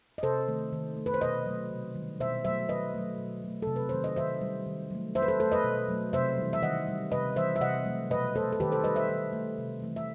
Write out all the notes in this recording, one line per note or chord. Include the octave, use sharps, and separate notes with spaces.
D#5
C3 A4 C5
D#3 A3
D#3
A3
B4
C5
B2 B4 D#5
F#3 A3
C3
D#3 G3
B2 C5 E5
F#3 A3 C5 E5
D#3 B4 D#5
F#3 A3
B2
F#3 A3
C3 A4
B4
D#3 F#3 A3 C5
D#5
D#3 C5 E5
G3
D#3
F#3 A3
D#3 C5 E5
B4
A4 C5
A3 A4 C5
B4 D#5
B2
F#3 A3
C3 C5 E5
E3 G3
E5
D#3 D#5 F#5
G3
C3 B4 D#5
E3 G3 C5 E5
E5
C3 D#5 F#5
F#3 A3
B2 B4 D#5
A3 A4 C5
A4
D#3 G4 B4
A4 C5
G3 B4 D#5
C5 E5
D#3
A3
C3
E3 A3
E5